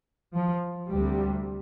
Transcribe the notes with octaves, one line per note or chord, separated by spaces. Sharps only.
F3
D2 C3 G3